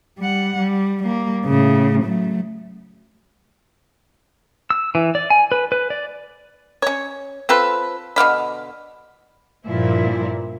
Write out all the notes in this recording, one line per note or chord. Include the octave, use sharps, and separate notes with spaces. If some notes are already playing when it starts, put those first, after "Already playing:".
G3 F#5
G3
G3 A#3
A2 C#3
F#3 A3
E6
E3
D5
G#5
B4
B4
D5
C#4 C#5
C4 F4 A4 B4
B2 D3 F5 B5
G2 A#2 F3 E4